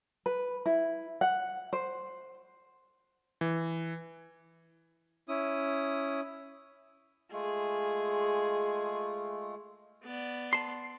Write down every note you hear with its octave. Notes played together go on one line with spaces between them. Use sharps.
B4
E4
F#5
C5
E3
C#4 E4 D#6
G#3 A3 F4 G#4
B3 D5
A5 C6